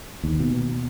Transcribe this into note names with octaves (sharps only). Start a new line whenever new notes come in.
D#2
B2